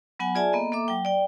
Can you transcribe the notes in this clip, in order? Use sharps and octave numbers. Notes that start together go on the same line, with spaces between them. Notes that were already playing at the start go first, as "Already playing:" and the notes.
F#3 B3 F#5 G#5
F4 G#4 D5 E5 G#5 A5
A#3 B3 A4 D#5
A#3 A4 E5 D6
F#3 G5
D5 G5